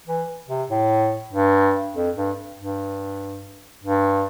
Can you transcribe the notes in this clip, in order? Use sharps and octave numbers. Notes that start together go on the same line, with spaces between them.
E3
C3
A2
G2
F2
G2
G2
G2